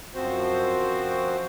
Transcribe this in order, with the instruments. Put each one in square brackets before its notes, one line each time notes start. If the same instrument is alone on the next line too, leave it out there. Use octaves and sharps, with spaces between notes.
[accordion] F#2 F3 C4 F#4 C5